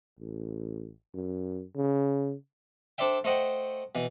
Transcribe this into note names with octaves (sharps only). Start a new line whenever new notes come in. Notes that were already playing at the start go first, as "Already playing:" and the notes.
A1
F#2
C#3
D4 A4 C5 D5 E5 G5
A3 C5 D#5 F#5 G5
B2 E3